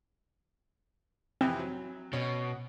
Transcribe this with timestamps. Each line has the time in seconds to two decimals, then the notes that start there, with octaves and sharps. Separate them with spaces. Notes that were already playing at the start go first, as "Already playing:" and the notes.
1.41 F2 C3 E3 C4
1.59 F#3
2.13 B2 C#4